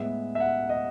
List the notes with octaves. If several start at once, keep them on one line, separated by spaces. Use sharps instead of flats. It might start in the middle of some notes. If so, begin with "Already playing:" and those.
Already playing: A2 G#3 B3 E5
E5
F#5
D#5